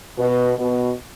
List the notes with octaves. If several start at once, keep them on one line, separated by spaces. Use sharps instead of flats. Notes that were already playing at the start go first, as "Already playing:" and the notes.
B2
B2